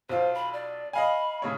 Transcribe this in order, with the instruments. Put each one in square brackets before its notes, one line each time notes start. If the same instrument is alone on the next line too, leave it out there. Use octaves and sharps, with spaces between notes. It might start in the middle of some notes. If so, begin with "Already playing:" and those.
[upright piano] B1 F4 [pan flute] C5
[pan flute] B5
D5
[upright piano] D#5 F5 G#5 [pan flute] B5
[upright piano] A2 C#3 C#5